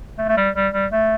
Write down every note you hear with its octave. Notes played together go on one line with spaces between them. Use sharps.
A3
A3
G3
G3
G3
A3